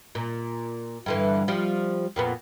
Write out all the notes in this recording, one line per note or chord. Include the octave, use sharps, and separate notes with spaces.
A#2
G2 D3 E3
F3 G3
F2 A#2 B3